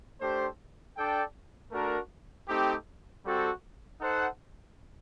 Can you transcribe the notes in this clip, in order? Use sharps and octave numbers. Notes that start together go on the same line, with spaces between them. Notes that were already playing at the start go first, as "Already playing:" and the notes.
A3 D4 G4 C5
D4 A4 D5 G5
A3 D4 F#4 A#4
A3 C4 D#4 G4
G3 C4 F#4 A4
D#4 A4 C5 F#5